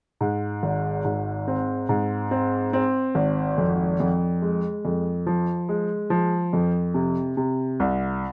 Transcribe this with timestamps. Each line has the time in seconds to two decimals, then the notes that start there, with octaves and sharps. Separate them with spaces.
0.21 G#2
0.63 G#1
1.05 G#2
1.48 C4
1.89 G#2
2.31 C4
2.73 C4
3.15 G#1
3.58 F2
4.00 F2
4.42 G#3
4.85 F2
5.26 F3
5.69 G#3
6.10 F3
6.53 F2
6.94 C3
7.37 C3
7.80 C2